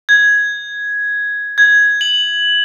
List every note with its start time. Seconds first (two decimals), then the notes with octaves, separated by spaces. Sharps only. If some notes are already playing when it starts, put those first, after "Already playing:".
0.09 G#6
1.58 G#6
2.01 F#7